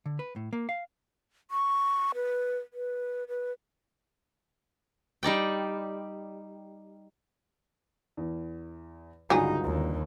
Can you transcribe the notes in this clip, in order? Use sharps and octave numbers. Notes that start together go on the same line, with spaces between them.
D3
B4
A2
A#3
F5
C#6
B4
B4
B4
G3 D#4 D5 G5
E2
C#2 G2 D3 F#3 D#4 G#4
D#2